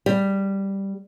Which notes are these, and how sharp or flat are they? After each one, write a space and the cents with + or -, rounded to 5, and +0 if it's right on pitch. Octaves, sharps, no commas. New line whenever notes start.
G3 +0